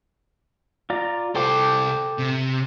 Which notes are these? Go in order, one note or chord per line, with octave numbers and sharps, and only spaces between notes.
F4 D5 A#5
C2 A4 C5 G5 D6
C3